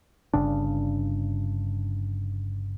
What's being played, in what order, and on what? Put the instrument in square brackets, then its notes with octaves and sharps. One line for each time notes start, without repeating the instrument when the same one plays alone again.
[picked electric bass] G1 G2 C#3 D4